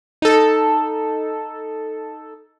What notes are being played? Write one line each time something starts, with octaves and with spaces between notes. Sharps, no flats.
D#4 A4